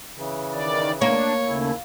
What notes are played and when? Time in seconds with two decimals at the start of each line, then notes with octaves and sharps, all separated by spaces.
0.16 C#3 E3
0.53 D#3 D5
1.02 A#3 D4 C#5
1.47 D#2 C#3 A3 E4 G#5